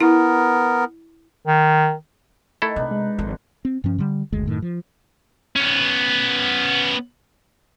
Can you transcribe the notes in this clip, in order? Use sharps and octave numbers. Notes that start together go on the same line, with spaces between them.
B3 E4 A#4
D#3
D#3 A3 E4 A4
C3 D4 D#4 B4
G#3
G#1 D3 F3
C4
G2 F3 C#4
D3 G3
F#1 D2 G#3
F#2 A2 D#3
F3
B3 C#4